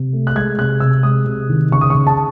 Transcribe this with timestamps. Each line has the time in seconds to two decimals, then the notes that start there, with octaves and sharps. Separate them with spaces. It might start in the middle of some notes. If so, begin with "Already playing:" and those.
Already playing: C3
0.13 A3
0.27 F#6
0.35 G#3 G#6
0.58 C3 F#6
0.80 C3 E6
1.03 G#3 D#6
1.26 C3
1.49 D#3
1.72 C#3 C#6
1.81 D#6
1.90 C#3 C#6
2.07 A5